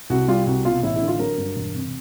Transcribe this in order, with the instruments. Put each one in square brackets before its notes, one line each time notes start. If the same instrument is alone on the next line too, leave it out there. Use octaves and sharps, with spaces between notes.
[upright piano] C2 F#4
G3 F4
C2 F#4
B2 F4
A1 E4
E4
D3
F4
F#3 A#4
G2
E1
C3